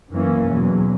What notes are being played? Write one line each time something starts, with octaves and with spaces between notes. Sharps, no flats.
F#2 E3 A#3 C#4
E2 B2 F#3